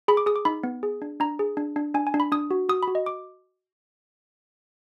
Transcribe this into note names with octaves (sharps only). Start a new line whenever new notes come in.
G#4 B5
D6
G#4 D#6
D6
D#4 B5
B3
G#4
D4
D4 A#5
G#4
D4
D4
D4 G#5
G#5
D4
B5
D4 D#6
F#4
F#4 D#6
B5
F#4
D#5
D6